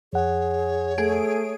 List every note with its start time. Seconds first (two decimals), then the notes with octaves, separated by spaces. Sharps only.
0.13 F2 G#4 C#5 F#5
0.98 A3 G#4 D7